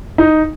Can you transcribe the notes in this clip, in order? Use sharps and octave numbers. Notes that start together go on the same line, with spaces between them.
D#4